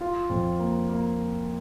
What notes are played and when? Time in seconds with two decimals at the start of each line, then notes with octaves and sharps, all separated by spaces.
0.01 F4
0.30 F2
0.59 A#3
0.89 A#3